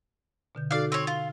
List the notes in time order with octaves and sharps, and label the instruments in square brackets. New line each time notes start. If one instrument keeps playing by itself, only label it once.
[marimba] B2 D3 G6
[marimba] D#4 F#4 A4 [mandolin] D5 F5
[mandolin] C4 C#5
F4